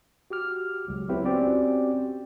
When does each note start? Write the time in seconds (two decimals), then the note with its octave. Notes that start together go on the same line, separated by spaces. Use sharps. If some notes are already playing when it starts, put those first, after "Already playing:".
0.30 F#4 G4 D6 F6
0.88 C#2 F#3
1.09 F#3 B3 C4 E4 G4 B4
1.25 C4 C#4 F#4 G4 D5